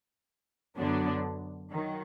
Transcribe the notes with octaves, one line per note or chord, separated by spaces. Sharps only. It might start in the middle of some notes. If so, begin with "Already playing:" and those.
F#2 D3 F#3 B3 D4
D#3 F#3